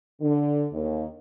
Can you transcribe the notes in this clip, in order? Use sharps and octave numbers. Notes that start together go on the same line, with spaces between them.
D3
D#2